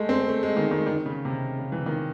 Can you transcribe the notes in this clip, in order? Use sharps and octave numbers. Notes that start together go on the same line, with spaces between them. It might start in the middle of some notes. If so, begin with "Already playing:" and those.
Already playing: G#3 A3
C4
A3
G#3
D#3
D#3
D#3
C#3
C3
C#3
E3
D#3